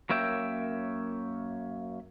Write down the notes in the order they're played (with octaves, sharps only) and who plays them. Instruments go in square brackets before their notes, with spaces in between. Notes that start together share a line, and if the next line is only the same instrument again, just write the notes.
[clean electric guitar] F#2 A#3 C#5 E5 G5